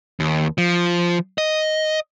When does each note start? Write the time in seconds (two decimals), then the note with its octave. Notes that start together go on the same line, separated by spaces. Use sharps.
0.20 D#2
0.58 F3
1.38 D#5